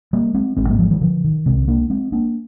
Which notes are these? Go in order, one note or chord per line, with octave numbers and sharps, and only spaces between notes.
G3 A#3
G#3 C4
G#1 G#2 G#3 C4
G3 A#3
F3 G#3
D#3 G3
D3 F3
D#3
C2 C3 G#3 C4
A#3 D4
G#3 C4
A#3 D4